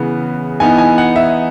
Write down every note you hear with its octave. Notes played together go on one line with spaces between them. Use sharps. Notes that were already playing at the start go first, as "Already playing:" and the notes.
Already playing: C#3 E3 B3
E3 B3 D#4 G#5
G#5
F#5
E5